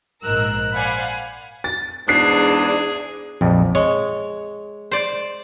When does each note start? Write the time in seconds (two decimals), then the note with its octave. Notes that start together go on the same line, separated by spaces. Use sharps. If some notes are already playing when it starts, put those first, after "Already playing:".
0.24 A#1 G#2 A#4 E6 F#6
0.73 C5 D5 F5 F#5 G#5 B5
1.64 A6
2.08 E2 G#2 D4 G#4 F#6 C7
3.41 A#1 F2
3.75 G#3 C#5
4.91 C5 D5